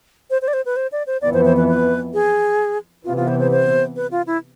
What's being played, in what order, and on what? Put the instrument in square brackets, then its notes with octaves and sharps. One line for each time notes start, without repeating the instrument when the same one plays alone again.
[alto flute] C5
C5
D5
C5
B4
C5
D5
C5
[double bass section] F2 E3 B3 [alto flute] D5
[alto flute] C5
C5
B4
B4
G#4
[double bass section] C3 E3 B3 [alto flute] F4
[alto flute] F4
C5
C5
C5
B4
F4
E4